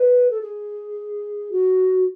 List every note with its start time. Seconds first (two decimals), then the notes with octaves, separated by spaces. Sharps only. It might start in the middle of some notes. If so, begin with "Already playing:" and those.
Already playing: B4
0.30 A4
0.41 G#4
1.52 F#4